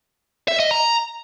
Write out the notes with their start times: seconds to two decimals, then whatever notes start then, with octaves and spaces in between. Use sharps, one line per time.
0.48 E5
0.60 D#5
0.71 A#5